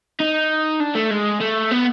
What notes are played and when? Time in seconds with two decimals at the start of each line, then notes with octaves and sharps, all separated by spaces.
0.20 D#4
0.80 D4
0.95 A3
1.10 G#3
1.40 A3
1.71 B3